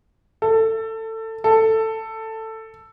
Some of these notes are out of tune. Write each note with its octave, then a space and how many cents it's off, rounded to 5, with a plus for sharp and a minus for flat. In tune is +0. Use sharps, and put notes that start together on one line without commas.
A4 +20
A4 +10